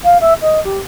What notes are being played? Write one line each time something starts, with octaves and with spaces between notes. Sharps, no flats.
F5
E5
D#5
G4